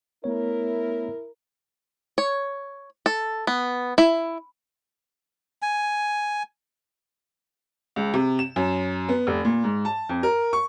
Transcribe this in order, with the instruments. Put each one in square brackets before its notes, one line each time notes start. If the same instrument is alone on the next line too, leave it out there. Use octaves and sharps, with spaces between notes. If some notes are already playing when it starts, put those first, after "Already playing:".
[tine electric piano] A3 B3 C#5 [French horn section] E4 A#4
[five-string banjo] C#5
A4
B3
E4
[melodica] G#5
[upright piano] C#2
C3
E7
F#2
B3
F1
A#2
G#2
A5
F2
A#4
C#6